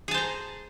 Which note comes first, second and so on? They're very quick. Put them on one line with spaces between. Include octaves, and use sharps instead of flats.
G#4 A5 C5 A#5